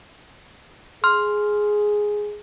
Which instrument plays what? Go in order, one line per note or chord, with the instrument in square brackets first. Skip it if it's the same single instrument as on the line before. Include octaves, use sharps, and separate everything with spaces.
[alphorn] G#4 [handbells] C6 F6